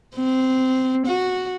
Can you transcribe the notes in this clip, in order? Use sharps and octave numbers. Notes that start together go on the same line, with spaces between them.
C4
F#4